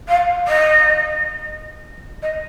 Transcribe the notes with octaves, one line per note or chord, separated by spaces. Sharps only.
F5
D#5
D#5